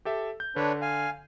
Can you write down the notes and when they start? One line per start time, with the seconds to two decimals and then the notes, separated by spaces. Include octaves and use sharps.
0.05 G4 A4 E5
0.40 G6
0.56 D3 D4 B4 C#5
0.82 F5 G#5